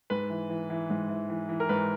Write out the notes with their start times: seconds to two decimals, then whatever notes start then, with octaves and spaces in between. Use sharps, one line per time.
0.10 G#2 B4
0.30 E3
0.50 E3
0.70 E3
0.90 G#2
1.09 E3
1.30 E3
1.49 E3
1.60 A#4
1.69 G#2 B4